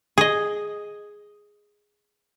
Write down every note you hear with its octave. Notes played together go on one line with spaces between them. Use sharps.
G#4 D#5